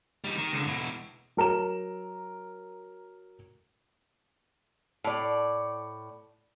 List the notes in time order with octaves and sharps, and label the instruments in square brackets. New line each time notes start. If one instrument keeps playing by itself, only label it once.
[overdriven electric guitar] G3 D#4
D#3
C#2 D3
B2 E4
[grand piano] F#3 A#4 A#5 E7
[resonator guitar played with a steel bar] A2 D5